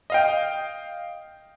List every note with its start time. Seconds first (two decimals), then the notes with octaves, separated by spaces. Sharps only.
0.10 D#5 F5 G5